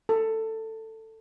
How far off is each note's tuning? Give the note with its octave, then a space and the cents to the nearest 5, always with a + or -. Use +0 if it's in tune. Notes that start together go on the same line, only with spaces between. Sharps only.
A4 +15